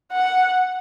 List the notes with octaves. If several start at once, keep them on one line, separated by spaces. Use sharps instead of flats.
F#5